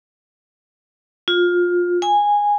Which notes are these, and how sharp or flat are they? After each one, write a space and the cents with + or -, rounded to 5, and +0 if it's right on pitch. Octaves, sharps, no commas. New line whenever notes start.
F4 +20
G#5 -10